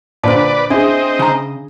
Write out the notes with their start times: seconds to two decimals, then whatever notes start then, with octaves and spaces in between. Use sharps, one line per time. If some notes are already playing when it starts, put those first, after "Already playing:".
0.24 A#2 D3 B4 C5 D5 A5
0.70 C4 D4 E4 G#4 D#5
1.19 C#3 A#5